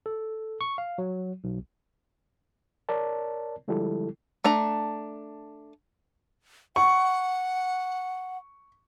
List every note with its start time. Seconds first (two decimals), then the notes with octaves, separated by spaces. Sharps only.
0.06 A4
0.61 C#6
0.78 F5
0.98 F#3
1.44 B1
2.89 A#4 C#5 D5 A5
3.68 D3 F3 G3 G#3 E4 A4
4.44 A3 D4 A#5
6.76 F#5 C#6